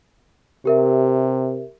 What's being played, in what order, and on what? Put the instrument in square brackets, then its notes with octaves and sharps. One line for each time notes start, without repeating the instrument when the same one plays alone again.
[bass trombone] C3 [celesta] G4 A#4 E5